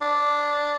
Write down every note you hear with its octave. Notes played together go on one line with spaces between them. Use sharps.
D4